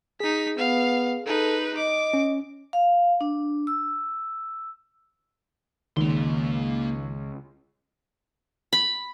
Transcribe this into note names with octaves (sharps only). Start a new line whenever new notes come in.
D#4 G#4 B6
B3 F5
D#4 A4 B4
D#5 D6
C#4
F5
D4
E6
C#2 D#3 A#3 C6
B5